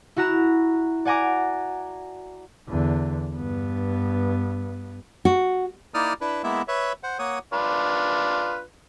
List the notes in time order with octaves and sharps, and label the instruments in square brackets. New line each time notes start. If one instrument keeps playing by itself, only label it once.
[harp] E4 F#4 A#5 F#6 E7
D5 F#5 G#5 A#5 D6
[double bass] E2 D3
G2 B3
[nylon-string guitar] F#4
[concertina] A#3 D#4 E4 D5 D#6 F6
D4 E4 B4
G#3 A#3 B3 E4 E5
B4 C#5 E5
C5 F#5
A#3 C#5 F#5 D#6
[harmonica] D4 F4 B4